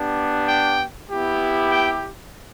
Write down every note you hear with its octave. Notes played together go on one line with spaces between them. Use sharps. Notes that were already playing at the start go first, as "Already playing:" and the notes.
Already playing: B3 D4 G4
G5
B3 E4 G4
G5